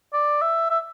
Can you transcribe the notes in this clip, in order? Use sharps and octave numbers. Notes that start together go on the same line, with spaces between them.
D5
E5
E5